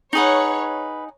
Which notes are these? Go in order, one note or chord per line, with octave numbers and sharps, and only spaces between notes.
D#4 G#4 B4 C#5 F#5